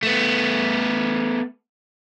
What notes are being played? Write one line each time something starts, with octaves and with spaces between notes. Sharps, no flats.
A3 B3